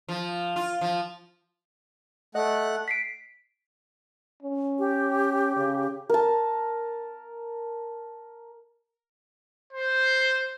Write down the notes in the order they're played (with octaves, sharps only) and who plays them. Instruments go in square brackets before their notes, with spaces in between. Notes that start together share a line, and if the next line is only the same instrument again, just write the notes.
[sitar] F3
F4
F3
[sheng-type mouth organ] A3 F#5 F#6 [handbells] D#5
[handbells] B6 C7 D7
[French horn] C#4
[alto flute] G4
[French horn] C#3
[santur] A#4 A5
[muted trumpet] C5